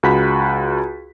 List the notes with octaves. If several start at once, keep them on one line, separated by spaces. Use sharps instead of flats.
C#2 F#4 B5 B6